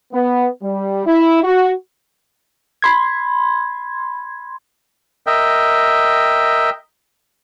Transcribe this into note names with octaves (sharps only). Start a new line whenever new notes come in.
B3
G3
E4
F#4
B5 C6 G#6
A#4 D#5 E5 G5